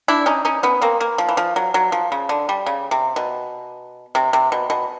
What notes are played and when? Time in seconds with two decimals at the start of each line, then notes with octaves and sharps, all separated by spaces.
0.08 D4 E4
0.26 C#4 D#4
0.45 C#4 D#4
0.63 B3 C#4
0.81 A#3 C4
1.00 A#3
1.18 F3
1.28 E3
1.37 F3
1.56 F#3
1.74 F#3
1.92 F3
2.12 C#3
2.29 D3
2.49 G3
2.66 C#3
2.91 C3
3.16 B2
4.15 C3
4.33 C3
4.52 B2
4.70 B2